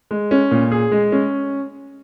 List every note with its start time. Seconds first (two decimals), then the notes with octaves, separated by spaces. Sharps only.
0.11 G#3
0.31 C#4
0.51 A#2
0.71 G#4
0.92 G#3
1.12 C#4